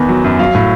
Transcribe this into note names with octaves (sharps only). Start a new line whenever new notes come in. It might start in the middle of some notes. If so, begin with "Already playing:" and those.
Already playing: E2 D#3 B3
F#3
F#2
F#3 F5
A2